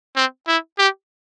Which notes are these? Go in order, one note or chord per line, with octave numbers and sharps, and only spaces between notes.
C4
E4
G4